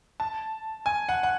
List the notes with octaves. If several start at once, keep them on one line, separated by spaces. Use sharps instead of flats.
A5
G#5
F#5
F#5